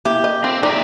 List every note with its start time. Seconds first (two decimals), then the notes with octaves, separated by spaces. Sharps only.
0.05 A#3 E4 G4
0.24 D#5
0.44 C4 F4
0.63 D#4 D5 E5 G5